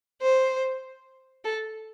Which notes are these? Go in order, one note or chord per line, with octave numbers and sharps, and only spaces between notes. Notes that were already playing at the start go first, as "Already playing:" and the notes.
C5
A4